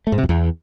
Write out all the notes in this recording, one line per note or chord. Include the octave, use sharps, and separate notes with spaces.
A3
G#2
C3
F2
E2